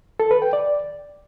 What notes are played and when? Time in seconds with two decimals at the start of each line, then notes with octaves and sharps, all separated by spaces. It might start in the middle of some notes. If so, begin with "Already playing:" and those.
0.20 A4
0.31 B4
0.42 G5
0.53 D5